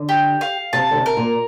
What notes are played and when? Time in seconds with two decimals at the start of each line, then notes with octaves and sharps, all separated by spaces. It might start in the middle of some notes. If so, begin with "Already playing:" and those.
Already playing: D3
0.09 G4
0.41 F5
0.73 C3 A5
0.91 D3
0.95 C3
1.06 A#4
1.17 A#2